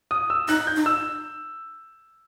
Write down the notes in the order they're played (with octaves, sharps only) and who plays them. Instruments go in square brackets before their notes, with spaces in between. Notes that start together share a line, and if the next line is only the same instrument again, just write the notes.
[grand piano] D#6
E6
[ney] D#4 [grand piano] F#6
[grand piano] G6
[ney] D#4
[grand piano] E6